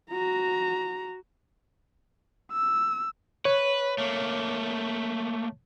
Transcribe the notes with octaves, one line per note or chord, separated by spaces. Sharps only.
F#4 A#5
E6
B4 C#5
A3 A#3